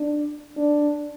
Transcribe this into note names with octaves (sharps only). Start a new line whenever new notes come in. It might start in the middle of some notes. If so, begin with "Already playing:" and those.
Already playing: D4
D4